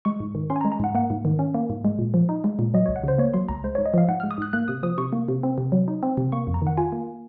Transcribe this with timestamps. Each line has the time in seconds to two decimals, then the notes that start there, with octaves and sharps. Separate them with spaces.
0.05 G#3 C#6
0.20 G#2
0.35 D#3
0.50 C#4 C6
0.56 G#5
0.61 A#5
0.65 G#3
0.72 A#5
0.80 G#2 F#5
0.95 A#3 F#5
1.10 G#2
1.25 D#3
1.39 C#4
1.54 A#3
1.70 G#2
1.85 G#3
1.99 A#2
2.14 F3
2.29 D#4
2.44 G#3
2.59 A#2
2.74 F#3 D#5
2.86 C#2 C#5
2.96 F#5
3.04 C#3 C5
3.18 A#3 C#5
3.33 F#3 C6
3.49 C#2 A#5
3.64 G#3 C5
3.75 G#2 C#5
3.86 D#5
3.94 F3 F5
4.08 G#2 F#5
4.20 G#3 F6
4.31 D#6
4.38 G#2 F#6
4.53 A#3 F#6
4.68 C3 D#6
4.83 F3 D#6
4.98 C3 C#6
5.13 A#3
5.28 C3
5.43 C4
5.58 C3
5.72 F#3
5.88 D#4
6.03 C4
6.17 C3
6.32 A#3 C#6
6.47 F2
6.54 A#5
6.62 D#3 F#5
6.77 F4 G#5
6.92 A#3